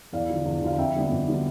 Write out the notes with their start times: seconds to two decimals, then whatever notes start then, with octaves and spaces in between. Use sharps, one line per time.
0.13 E2 D5 F5
0.30 D3 F3
0.45 E2
0.62 D3 F3 F5
0.78 F2 E5 G5
0.95 D3 G3 B3
1.11 F2
1.28 D3 G3 B3